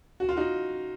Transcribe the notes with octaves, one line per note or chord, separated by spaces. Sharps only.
F#4
F4
D#4 F#4